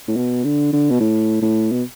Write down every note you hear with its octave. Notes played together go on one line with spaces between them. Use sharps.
A2
B2
D3
D3
B2
A2
A2
B2